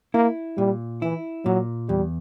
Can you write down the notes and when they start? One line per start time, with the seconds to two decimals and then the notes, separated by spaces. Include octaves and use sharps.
0.14 A#3 E4
0.58 A#2 G3
1.02 E3 E4
1.45 A#2 F#3
1.89 E2 G3